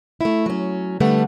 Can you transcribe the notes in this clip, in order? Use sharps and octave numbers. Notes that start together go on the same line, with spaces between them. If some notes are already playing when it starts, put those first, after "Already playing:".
A3 E4
F#3 C#4
D3 G3 A3 B3